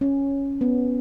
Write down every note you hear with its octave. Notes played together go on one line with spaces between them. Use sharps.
C#4
B3